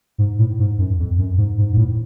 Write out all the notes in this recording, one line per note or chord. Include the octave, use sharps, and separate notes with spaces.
G#2
A2
G#2
F#2
F2
F#2
G#2
G#2
G#2
A2